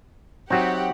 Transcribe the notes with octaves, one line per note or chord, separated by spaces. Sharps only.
F#3 C4 D#4 F#4 G4 E5 F#5